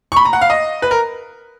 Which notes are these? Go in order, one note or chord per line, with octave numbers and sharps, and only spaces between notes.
C#6
B5
A#5
F#5
F5
D#5
B4
A#4